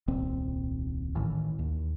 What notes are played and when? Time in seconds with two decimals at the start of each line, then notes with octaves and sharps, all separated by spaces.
0.08 D#1 C2 A#2 C4
1.15 A1 A2 D#3 E3
1.59 D#2